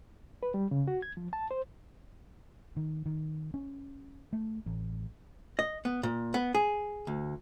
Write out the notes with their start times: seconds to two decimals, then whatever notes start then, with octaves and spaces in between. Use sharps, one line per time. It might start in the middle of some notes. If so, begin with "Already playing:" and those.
0.43 B4
0.54 G3
0.71 C#3
0.88 F#4
1.02 G#6
1.17 F3
1.33 A5
1.51 C5
2.77 D#3
3.06 D#3
3.54 C#4
4.33 A3
4.66 A1
5.59 D#5
5.85 B3
6.03 A#2
6.34 B3
6.54 G#4
7.07 D2